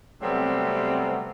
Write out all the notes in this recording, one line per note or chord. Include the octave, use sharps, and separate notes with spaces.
C3 F#3 G3 A3 B3 C4